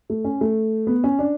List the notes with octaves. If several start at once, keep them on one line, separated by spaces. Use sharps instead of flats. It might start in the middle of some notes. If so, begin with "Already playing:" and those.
A3
C#4
A3
B3
C#4
D4